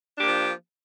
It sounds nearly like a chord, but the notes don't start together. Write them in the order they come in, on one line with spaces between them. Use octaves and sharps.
D4 G4 A#3 F3